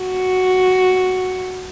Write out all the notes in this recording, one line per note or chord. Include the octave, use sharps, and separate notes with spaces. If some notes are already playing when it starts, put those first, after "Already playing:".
Already playing: F#4